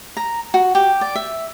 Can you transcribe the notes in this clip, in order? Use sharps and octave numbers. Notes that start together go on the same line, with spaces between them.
A#5
F#4
G4
D5
E5